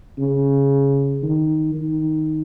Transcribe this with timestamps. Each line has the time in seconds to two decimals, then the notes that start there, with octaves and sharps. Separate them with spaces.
0.19 C#3
1.23 D#3
1.74 D#3